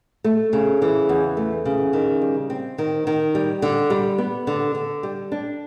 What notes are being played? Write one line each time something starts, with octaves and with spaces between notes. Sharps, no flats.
A3
C#3
E3
E2
A3
C#3
D#3
G3
C4
D#3
D#3
G3
D3
G3
B3
D3
D3
G3
D4